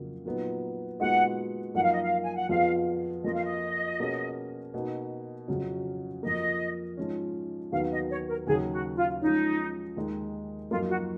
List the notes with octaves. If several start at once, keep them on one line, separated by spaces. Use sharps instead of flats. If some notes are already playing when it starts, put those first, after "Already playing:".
Already playing: F2 C#3 F#3 A#3
A#2 F#3 B3 D#4
A#2 G#3 B3 D#4 F#4 F#5
F#2 F3 A#3 D#4 A#4 F#5
F5
D#5
F5
G#5
F#5
F2 F3 B3 F4 G#4 F5
F2 F3 A#3 F4 D#5
F5
D#5
B2 A#3 C#4 G#4
B2 A#3 D#4
F2 C#3 F#3 C#4 F#4
F2 F3 A#3 D#5
G#2 F3 G#3 C#4
D#2 D#3 F#3 B3 F#4 F5
D#5
C#5
A#4
D#2 C#3 F#3 C#4 G#4
F#4
F4
F3 G#3 C#4 D#4
D#2 D#3 G#3 D#4
F#2 F3 A#3 D#4 F4
F#4